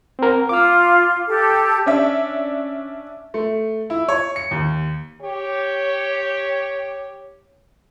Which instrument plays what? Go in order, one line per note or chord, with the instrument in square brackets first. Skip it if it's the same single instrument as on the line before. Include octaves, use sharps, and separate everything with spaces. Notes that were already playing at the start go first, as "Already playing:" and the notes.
[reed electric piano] C4 A#4
[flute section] F4 [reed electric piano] D6 F6
[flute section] G4 A4
[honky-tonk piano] C#4 D4 E5
[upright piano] A3
E4
C#5
C#7
D#2
[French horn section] G4 C#5